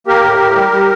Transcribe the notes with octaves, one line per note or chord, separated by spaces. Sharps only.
A#3 G4 A#4
A2
A2
G3
G3